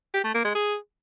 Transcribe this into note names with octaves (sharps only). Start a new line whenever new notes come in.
G4
A3
A#3
G#3
G#4